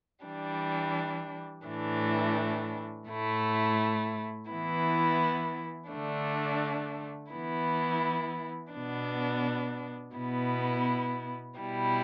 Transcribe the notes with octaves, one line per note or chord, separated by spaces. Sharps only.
E3 G3 D4
A2 E3 A3 D4
A2 A3 E4
E3 B3 E4
D3 A3 D4
E3 B3 E4
B2 B3 D4
B2 B3 E4
B2 G3 E4